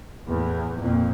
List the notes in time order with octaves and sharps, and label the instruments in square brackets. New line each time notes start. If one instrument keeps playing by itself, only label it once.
[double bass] E2 A2
F2 A#2